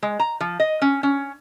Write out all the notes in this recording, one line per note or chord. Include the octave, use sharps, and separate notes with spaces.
G#3
A#5
F3
D#5
C#4
C#4